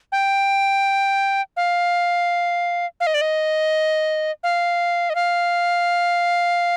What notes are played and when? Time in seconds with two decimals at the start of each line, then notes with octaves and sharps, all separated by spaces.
0.12 G5
1.57 F5
3.00 F5
3.07 D#5
3.14 D5
3.21 D#5
4.43 F5
5.10 D#5
5.15 F5